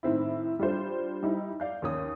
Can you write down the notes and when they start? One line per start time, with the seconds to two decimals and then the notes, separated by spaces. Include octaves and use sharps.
0.03 A2 D#3 C4 E4
0.59 G3 D4 F4 C5
1.22 G3 D#4 E4
1.60 D5 F5 G6
1.82 D#2 C#4 D#6